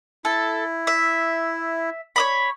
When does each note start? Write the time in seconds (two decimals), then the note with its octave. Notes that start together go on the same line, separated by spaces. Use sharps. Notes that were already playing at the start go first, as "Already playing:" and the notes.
0.25 E4 A4
0.87 E5
2.16 C#5 D#5 B5